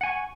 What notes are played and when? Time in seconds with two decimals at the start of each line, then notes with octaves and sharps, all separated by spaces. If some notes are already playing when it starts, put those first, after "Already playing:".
0.01 F#5
0.03 G#5
0.06 C#6